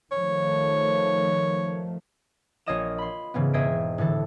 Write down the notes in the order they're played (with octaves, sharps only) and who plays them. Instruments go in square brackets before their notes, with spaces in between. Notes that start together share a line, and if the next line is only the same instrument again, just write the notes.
[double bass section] D#3 F3 A3 [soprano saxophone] C#5
[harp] A#1 F4 C#5 D#5 D#6 E7
B5 C6
G#2 C#3 E3 B3
E1 D#5 E5 G#6 C7 D7
A2 D3 E3 A4